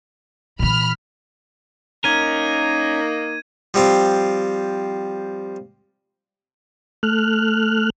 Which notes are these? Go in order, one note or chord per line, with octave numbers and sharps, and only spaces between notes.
A#2 E3 B5 F6
A#3 C#4 D#4 A#4 G#6 D#7
F3 G3 C4 F4
A3 F6 F#6